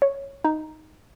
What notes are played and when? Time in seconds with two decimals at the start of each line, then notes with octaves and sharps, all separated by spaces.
0.02 C#5
0.45 D#4